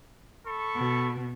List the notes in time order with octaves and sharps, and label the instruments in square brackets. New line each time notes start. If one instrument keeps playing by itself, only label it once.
[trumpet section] A4 B5 C#6
[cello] B2